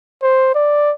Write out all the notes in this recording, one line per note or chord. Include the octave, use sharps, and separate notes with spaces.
C5
D5